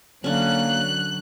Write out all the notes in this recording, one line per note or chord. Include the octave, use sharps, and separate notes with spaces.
D3 F#3 A#3 C#4 F#6